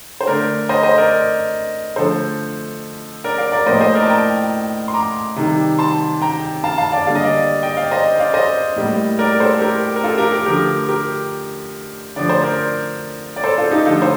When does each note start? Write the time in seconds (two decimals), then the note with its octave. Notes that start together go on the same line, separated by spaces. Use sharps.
0.21 C5
0.27 D3 A3 A#4 D5
0.69 C5 D#5
0.83 C5 D#5
0.97 A#4 D5
1.96 D3 F3 A3 A4 C5
3.24 A#4 D5
3.38 D5 F5
3.52 A#4 D5
3.66 A2 F3 A#3 C5 D#5
3.81 C5 D#5
3.95 A#4 D5
4.03 A5
4.09 G5 A#5
4.88 C6
4.94 A#5 D6
5.36 C3 D#3 G3
5.79 A5 C6
6.22 G5 A#5
6.64 F5 A5
6.78 F5 A5
6.92 D5 F5
7.07 D3 G3 A#3 F5
7.15 D#5
7.24 D5 F5
7.63 D#5 G5
7.77 D5 F5
7.91 C5 D#5
8.19 D5 F5
8.34 C5 D#5
8.76 A2 G3 A#3
9.19 A#4 D5
9.40 A4 C5
9.61 G4 A#4
9.96 A#4
10.03 F4 A4
10.18 G4 A#4
10.32 G4 A#4
10.46 D3 F3 A3 G4 A#4
10.89 G4 A#4
12.16 D3 F3 A3 D5
12.29 C5
12.43 A#4 D5
13.36 D5
13.44 A4 C5
13.57 F4 A4
13.71 D#4 G4
13.86 D3 F3 A3 F4 A4
14.02 C5